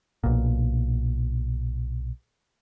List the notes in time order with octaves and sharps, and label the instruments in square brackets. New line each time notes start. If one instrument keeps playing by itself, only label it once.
[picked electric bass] B1 A#2